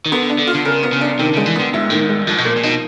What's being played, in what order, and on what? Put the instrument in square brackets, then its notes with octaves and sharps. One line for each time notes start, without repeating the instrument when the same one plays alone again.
[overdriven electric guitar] D#3
[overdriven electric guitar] D3 [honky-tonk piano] B3
[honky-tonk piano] D4
[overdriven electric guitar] D3
[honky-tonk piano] F4
[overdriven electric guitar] D3
[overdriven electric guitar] C#3 [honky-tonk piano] A#4
[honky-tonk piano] B3
[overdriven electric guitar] C#3
[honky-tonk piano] D4
[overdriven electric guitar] C3 [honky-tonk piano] D#3
[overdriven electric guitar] C#3 [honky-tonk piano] G#3
[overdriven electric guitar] E3
[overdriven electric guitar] D3 [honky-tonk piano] B3
[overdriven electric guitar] G#2 [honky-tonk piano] E4
[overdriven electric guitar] A2 [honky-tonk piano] D#3
[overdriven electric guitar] G#2
[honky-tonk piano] G#3
[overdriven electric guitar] G2
[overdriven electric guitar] G#2 [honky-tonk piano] F3
[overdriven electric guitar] B2
[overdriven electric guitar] A#2 [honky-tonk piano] A#3
[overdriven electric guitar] A#2
[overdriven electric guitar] B2 [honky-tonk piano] D#4